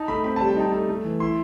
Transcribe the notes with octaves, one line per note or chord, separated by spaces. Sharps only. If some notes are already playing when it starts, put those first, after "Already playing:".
Already playing: D#4 A5
A3 B5
C4 B5
G3 A5
G5
D#4 A5
A3
A3
E3
E4 C6